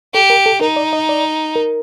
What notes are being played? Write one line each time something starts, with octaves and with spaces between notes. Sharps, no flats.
G4 A4
A#4
A4
D#4 A#4
D5
D#5
D5
A#4